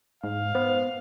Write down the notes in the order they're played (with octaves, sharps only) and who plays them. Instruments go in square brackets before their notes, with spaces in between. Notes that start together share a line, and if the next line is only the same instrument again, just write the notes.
[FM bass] G#2 [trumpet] F5
[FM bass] B3 [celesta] C5